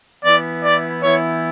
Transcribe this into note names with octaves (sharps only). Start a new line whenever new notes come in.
E3 B3 E4 D5
D5
E3 B3 E4 C#5